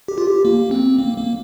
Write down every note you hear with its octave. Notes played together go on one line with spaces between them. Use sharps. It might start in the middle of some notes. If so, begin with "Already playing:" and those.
G4
F4
G4
A#3
C4
A#3
A#3